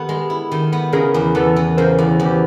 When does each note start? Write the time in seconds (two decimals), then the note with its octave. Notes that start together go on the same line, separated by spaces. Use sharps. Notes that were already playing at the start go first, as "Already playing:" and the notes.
Already playing: D#3 B3 G4 A4
0.09 G#3
0.30 E4
0.51 D#3
0.72 B3
0.93 C#3 G#4 A#4
1.14 E2
1.35 E2 A4 B4
1.56 E3
1.77 C#3 A#4 C5
1.98 E2
2.20 E2
2.25 G4